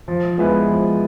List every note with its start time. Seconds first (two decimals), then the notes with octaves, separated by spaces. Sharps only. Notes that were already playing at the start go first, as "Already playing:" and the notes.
0.08 F3
0.38 G#3 B3 E4 B4
0.68 F3